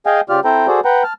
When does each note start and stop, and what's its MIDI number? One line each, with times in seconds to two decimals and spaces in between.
0.06 0.21 68
0.06 0.21 75
0.06 0.21 77
0.06 0.21 79
0.06 0.21 80
0.29 0.40 49
0.29 0.40 65
0.29 0.40 67
0.29 0.40 74
0.29 0.40 89
0.45 0.67 60
0.45 0.67 64
0.45 0.67 69
0.45 0.67 72
0.45 0.67 79
0.45 0.67 82
0.67 0.80 66
0.67 0.80 68
0.67 0.80 69
0.67 0.80 72
0.67 0.80 74
0.85 1.03 71
0.85 1.03 78
0.85 1.03 79
0.85 1.03 82
1.04 1.13 81
1.04 1.13 89